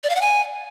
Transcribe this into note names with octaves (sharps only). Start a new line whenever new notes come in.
D5
F5
F#5
G#5